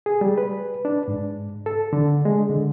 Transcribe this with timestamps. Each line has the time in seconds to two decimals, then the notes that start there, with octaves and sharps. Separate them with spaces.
0.06 G#4
0.21 G3
0.38 B4
0.85 D4
1.08 G#2
1.66 A4
1.93 D3
2.25 G#3
2.49 D3